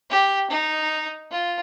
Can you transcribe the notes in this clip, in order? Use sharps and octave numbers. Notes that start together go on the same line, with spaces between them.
G4
D#4
F4